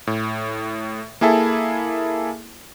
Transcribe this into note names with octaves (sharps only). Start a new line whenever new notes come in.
A2
A#3 E4 G#4 A4 E5